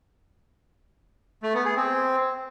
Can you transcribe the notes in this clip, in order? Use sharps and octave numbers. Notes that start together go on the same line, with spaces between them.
A3
B3
G#4
C4